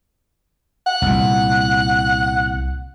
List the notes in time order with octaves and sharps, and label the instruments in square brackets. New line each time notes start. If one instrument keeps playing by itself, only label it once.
[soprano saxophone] F#5
[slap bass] C2 A#2